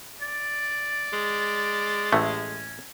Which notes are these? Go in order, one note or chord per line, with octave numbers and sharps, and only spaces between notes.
D5
G#3
A1 A3 C#4